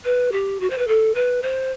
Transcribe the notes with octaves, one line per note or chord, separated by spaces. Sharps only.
B4
G4
F#4
C5
B4
A4
B4
C5